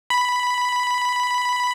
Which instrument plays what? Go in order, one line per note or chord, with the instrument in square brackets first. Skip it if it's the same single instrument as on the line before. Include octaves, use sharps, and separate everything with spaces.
[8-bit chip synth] B5